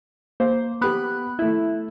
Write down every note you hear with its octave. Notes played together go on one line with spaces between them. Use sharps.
A#3 C5
B3 G4 B4 B5 F#6
A3 E4 E5